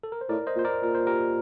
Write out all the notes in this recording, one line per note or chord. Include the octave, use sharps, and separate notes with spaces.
A4
A#4
C5
A2 A#4 D5
C5 D#5
A#2
C5
A#4 D5
A#2 A#4
C5
G4 A#4